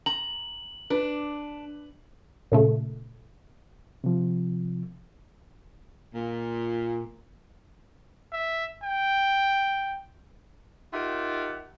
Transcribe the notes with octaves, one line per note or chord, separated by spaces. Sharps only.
A#5 F#7
D4 B4
A#2 C#3 A3
C3 F3
A#2
E5
G5
D#4 F4 G4 A#4 E5 F#5